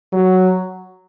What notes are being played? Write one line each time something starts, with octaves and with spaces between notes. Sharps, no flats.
F#3